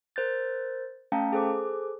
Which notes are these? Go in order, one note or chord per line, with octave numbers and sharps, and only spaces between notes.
A#4 C5 G6 A6
A3 C#4 F5 G5 A5 A#5
G#4 A4 C5 D6